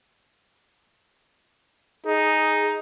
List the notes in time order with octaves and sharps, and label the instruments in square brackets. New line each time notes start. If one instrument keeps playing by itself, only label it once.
[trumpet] D#4 [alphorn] G#4